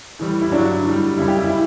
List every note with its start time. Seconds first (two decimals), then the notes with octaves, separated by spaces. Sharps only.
0.19 A2 E3 G3
0.41 E4
0.51 G2 D3 F#3 D4
0.84 A2 G3
1.17 F#2 C#3 G3 E4
1.28 G4
1.39 E4
1.50 A2 E4